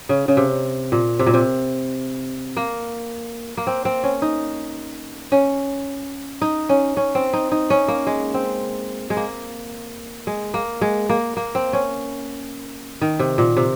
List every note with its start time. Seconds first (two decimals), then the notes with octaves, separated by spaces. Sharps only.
0.09 C#3
0.28 C#3
0.37 C3
0.92 A#2
1.19 C3
1.26 A#2
1.34 C3
2.57 A#3
3.57 A#3
3.67 C4
3.85 C4
4.03 C#4
4.22 D#4
5.32 C#4
6.42 D#4
6.69 C#4
6.97 C#4
7.15 C4
7.33 D#4
7.52 D#4
7.70 C#4
7.88 A#3
8.07 G#3
8.34 C4
9.10 G#3
9.17 A#3
10.27 G#3
10.54 A#3
10.81 G#3
11.09 A#3
11.37 A#3
11.55 C4
11.73 C#4
13.01 D#3
13.19 C3
13.38 A#2
13.57 C3